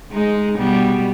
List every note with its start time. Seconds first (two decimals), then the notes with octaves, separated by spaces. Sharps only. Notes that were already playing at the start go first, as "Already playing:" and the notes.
0.12 G#3 D#4
0.58 B2 G3 B3